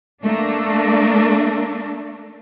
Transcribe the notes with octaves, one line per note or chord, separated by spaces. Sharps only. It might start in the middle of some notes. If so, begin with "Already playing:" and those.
A3 A#3 D4